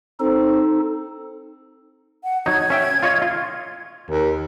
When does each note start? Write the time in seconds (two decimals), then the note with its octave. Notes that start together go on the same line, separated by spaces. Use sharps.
0.20 C4 D#4 A4
2.24 F#5
2.46 F#3 D#4 G#6
2.70 C#4 E5 G5
3.03 F4 C#5 D#5
3.22 F4
4.10 D#2